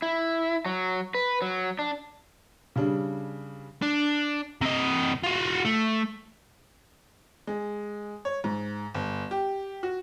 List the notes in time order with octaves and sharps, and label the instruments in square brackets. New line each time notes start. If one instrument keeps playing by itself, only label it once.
[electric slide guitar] E4
F#3
B4
F#3
D4
[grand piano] C#3 G3 D4
[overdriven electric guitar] D4
C3 D#5
F4 F#4
A3
[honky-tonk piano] G#3
C#5
G#2
G1
G4
F#4